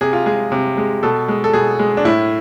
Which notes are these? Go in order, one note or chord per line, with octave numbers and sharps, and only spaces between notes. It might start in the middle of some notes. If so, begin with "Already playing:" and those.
C3 G#4
F4
G#3 G#4
C3
G#3
B2 A4
G#3
A4
B2 G#4
G#3
D4
A2 E4